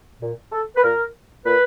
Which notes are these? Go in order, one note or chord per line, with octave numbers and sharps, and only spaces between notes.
A#2
A4
B4
A#2 A#4
A#2 B4